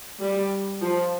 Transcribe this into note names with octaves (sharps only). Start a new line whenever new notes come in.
G3
F3